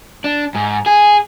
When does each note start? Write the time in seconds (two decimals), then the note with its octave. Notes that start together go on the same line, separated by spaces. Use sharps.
0.24 D4
0.55 G#2
0.86 G#4